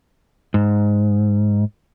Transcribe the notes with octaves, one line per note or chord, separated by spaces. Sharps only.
G#2